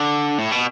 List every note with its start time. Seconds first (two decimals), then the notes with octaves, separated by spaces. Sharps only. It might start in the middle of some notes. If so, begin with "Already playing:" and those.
Already playing: D3
0.38 A2
0.52 B2